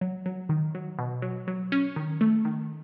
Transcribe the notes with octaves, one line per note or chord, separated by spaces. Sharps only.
F#3
F#3
D#3
F#3
B2
F#3
F#3
C#4
D#3
A3
D#3